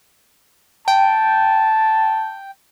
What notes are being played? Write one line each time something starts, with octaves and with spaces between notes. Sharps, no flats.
G5 A5